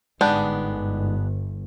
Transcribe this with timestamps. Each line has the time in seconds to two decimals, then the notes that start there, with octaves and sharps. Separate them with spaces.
0.21 G1 G#2 G#3 B3 D4 G4